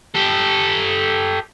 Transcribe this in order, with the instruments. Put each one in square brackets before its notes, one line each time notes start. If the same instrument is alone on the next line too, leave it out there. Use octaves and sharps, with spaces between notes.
[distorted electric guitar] G4 A4